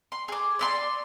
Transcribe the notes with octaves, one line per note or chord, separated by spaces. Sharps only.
C6
G#4 D6
D5 E5 C6